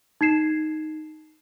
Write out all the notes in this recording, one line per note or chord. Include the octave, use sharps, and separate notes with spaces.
D#4 G#6 C7 E7